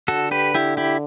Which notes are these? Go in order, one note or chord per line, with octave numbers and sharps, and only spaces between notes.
D3 F#4 A4
G4 B4
E4 G4
E4 G4